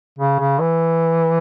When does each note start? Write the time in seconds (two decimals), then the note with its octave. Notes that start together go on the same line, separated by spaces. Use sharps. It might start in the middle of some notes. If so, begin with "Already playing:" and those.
0.19 C#3
0.39 C#3
0.59 E3